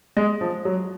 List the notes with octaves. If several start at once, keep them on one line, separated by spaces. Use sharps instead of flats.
G#3
F3
F#3